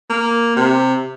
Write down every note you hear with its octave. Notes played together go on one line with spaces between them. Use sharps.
A#3
C3